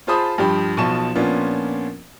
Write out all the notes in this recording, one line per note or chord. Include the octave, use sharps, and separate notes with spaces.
F4 G#4 C5 A5 B5 D#6
G2 F3 G4 G5 B5
B1 B2 F3 A5 C#6 E7
A#2 F3 B3 C#4 D4 F4